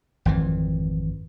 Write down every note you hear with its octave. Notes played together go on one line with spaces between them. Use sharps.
G#1 F2 E3